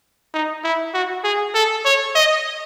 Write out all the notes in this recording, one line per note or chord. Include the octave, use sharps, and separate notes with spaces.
D#4
E4
F#4
G#4
A4
C#5
D#5